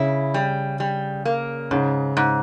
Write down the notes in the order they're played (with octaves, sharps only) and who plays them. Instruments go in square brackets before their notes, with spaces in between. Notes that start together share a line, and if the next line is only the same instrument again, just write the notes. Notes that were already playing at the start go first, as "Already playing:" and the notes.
Already playing: [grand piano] C#3 [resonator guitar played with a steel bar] E4
[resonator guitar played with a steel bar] G3
G3
A#3
[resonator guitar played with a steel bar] G#2 [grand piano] C#3
[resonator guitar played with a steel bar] G#2